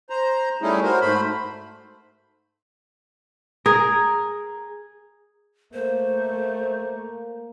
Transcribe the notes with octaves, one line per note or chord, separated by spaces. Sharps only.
C5 A#5
G3 A3 C#4 D#4 E4 G#4
F#4 A#4 C5
G#2 A3 C5 B5
G#4 A#4
A3 A#3 C5